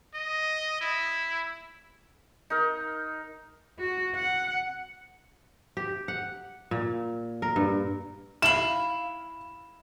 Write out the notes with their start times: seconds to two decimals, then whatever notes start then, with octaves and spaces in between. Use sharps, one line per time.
0.14 D#5
0.81 E4
2.50 D#4 A#4
3.80 F#4
4.16 F#5
5.77 G4
6.08 F#5
6.71 A#2
7.42 A#4
7.56 G2
8.42 E4 F5 E7 F#7